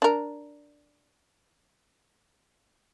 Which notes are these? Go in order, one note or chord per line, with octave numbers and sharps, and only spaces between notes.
D4 A#4